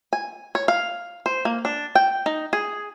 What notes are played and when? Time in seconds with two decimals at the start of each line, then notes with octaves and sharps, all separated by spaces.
0.13 G#5
0.55 C#5
0.68 F5
1.26 C5
1.45 A#3
1.65 D4
1.95 G5
2.26 D#4
2.53 G#4